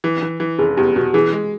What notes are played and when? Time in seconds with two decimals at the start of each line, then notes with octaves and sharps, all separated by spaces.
0.04 E3
0.23 E3
0.40 E3
0.59 F1 G#4
0.77 E2 G4
0.96 B2 F#4
1.14 E3 G#4
1.32 G#3